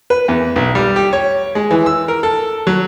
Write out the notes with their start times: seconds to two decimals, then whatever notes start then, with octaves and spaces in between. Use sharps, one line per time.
0.10 B4
0.28 E2
0.56 B1
0.75 G3
0.96 G4
1.13 C#5
1.55 G#3
1.71 E3
1.86 E6
2.08 A#4
2.23 A4
2.67 F#3